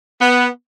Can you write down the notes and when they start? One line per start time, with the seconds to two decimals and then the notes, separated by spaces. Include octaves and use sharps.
0.21 B3